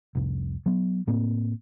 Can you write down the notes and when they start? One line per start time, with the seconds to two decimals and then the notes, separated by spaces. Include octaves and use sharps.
0.15 F1 C2
0.66 F#3 B3
1.07 A2 A#3 C4